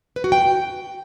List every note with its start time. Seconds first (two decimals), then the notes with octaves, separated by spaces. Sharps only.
0.16 B4
0.24 F#4
0.32 G5